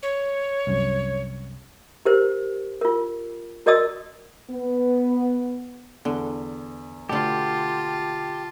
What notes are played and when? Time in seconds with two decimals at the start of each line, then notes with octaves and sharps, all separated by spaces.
0.03 C#5
0.67 C2 F#2
2.05 G4 A#4 C5
2.81 F4 A#4
3.66 F#4 A#4 D5 D#5 D#6 E6
4.51 B3
6.05 E2 D3
7.09 B2 D3 A3 F4 G4 D5 A5